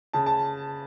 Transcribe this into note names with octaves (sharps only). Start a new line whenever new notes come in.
C#3 A5
A5